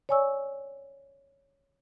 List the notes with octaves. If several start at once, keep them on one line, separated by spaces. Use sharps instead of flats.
C#5 D5 G#5 C#6 E6